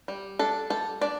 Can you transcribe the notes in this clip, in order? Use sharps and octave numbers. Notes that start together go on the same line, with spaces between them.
G3
D4 A4
G3 A4
D4 D5